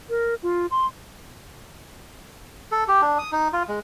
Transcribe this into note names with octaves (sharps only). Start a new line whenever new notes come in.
A#4
F4
C6
A4
G4
D4
D#6
D#4
F4
G#3